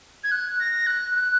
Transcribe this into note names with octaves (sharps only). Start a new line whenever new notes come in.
G#6
F#6
A#6
F#6
F#6